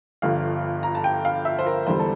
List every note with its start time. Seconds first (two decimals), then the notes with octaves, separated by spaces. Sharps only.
0.22 G1 G2 D3 F3 F5
0.83 A#5
0.95 A5
1.04 G5
1.25 F5
1.45 E5
1.59 C5
1.66 A#4
1.87 E1 E2 D3 G3 C5
1.99 A4